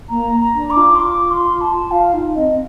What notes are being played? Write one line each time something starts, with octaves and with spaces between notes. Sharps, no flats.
A#3 A#5
A#5
D4
D6
F4
C6
F4 D6
C6
A5
F4 F5
D#4
C4 D#5
C4